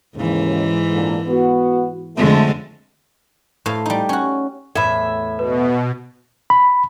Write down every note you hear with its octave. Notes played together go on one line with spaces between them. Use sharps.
D#2 G#2 C#3 E3
A#2 D3 A#3
B3 F#4
F2 D3 G#3 A3
A2 C5 F5
G3 D#4
C#4 F#4
E2 A2 E5 B5 G#6
B2 B4
B5